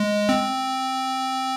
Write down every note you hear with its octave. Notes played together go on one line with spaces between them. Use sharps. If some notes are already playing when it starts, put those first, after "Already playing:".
Already playing: G#3
C4